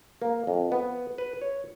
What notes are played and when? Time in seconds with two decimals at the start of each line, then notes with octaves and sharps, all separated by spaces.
0.22 A#3
0.47 F2
0.72 B3
1.18 B4
1.41 C#5